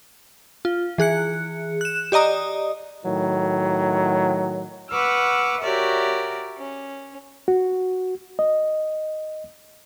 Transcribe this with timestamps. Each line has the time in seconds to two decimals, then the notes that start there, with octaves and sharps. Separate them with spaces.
0.65 F4
0.98 E3 G#4 F#6 C#7
1.81 F#6 E7
2.12 G4 D5 D#5 A#5 D#6
3.05 A2 D#3 F#3
4.90 B4 F#5 C#6 D6 E6 F6
5.61 F#4 G4 A#4 C#5 D5 E5
6.57 C#4
7.48 F#4
8.39 D#5